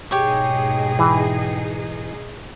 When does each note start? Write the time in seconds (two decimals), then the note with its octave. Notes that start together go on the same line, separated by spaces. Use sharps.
0.11 G#2 B2 D#4 G4 G#4 C#5
0.99 E3